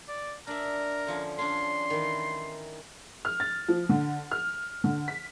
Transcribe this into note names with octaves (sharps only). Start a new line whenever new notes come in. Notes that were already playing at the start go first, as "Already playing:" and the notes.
D5
D4 A#4 D5 E5
D3 F3 C#4
C#4 D4 C6
D#3 E3
F6
A6
F3
D3
F6
D3
B6